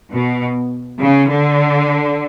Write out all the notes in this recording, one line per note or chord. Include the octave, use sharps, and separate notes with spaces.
B2
C#3
D3